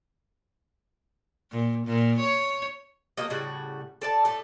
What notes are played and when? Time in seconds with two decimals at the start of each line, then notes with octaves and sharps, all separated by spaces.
1.51 A#2
1.86 A#2
2.20 C#5
3.17 D3 F#3 A#3 D#5
3.30 A2 C#3 G3 F#4
4.02 A4 D5 A5
4.25 A2 A3 A4